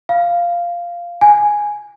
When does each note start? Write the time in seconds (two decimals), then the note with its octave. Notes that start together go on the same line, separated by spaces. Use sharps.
0.09 F5
1.21 G#5